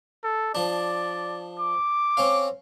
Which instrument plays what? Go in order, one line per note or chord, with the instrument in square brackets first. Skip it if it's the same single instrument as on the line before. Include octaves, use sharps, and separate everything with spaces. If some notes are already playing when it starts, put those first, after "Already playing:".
[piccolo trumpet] A4
[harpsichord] F3 D4 [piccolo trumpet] D5
[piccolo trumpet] D6
[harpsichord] C4 C#4 F5